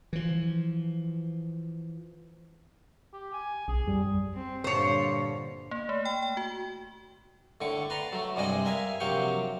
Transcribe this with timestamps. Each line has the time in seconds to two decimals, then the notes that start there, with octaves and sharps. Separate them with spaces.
0.13 E3 F3
3.13 G4
3.33 G#5
3.68 B1 G#4
3.87 F#2 G3
4.34 C4
4.64 G2 A#2 D3 C5 C#5
5.71 A#3
5.89 A3
6.05 G5
6.23 G5
6.37 F#4
7.61 A2 D3 C#6 D6
7.90 B4 A5 A#5 C6
8.12 F#3 A3
8.36 G2 C3 G3 G#3 G#4 D#5
8.65 A#4 E5 F5 G#5
9.00 A#1 C3 F#3 F5 G5 C#6